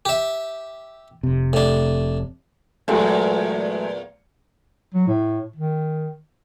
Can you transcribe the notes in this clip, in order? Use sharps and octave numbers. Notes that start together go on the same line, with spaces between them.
G4 E5
F1 C3
A2 D4
E2 A#2 F#3 G#3 A3
F#3
A2
D#3